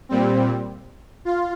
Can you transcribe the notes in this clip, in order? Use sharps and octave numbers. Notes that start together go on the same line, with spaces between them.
A#2 G3 C4
F4